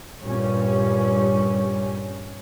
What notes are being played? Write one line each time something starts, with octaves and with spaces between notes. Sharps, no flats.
G2 A#2 G3 C#4